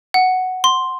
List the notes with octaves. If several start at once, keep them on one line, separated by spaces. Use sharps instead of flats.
F#5
C6